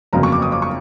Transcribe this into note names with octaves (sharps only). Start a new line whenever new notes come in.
G1 F2 C#3 F#3 A#3 A#5
C#6
D6
D#6
D6
C#6